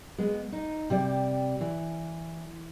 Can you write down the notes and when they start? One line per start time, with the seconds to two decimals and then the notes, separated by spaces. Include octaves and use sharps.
0.18 G#3 B3
0.52 D#4
0.90 C3 G3 D5
1.61 E3